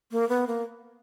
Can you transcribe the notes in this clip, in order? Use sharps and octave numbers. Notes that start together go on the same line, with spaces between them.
A#3
B3
A#3